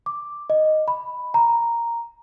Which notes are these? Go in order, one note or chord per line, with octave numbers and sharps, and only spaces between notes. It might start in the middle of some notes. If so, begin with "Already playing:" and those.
D6
D#5
B5
A#5